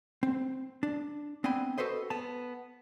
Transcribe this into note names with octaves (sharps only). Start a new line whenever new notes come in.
C4
D4
B3 C4 D4 G5 G#5 B5
F#4 A4 B4 C5 D#5
B3 A5